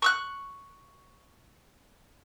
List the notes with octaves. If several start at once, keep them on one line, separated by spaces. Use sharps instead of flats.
C#6 E6 F#6